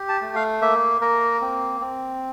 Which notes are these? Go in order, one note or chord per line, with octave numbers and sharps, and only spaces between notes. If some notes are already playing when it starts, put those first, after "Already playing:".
Already playing: G4
A5
A3
F5
A#3 E5
A#3 A#4
C4
C4